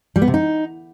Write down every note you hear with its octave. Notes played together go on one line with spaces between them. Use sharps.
G3
B3
C3
D#4